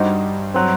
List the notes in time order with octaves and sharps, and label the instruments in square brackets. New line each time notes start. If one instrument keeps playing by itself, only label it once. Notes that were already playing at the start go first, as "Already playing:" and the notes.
Already playing: [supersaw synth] G2 [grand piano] G3 D#4 F#4 C5 D#5
[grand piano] F#3 C4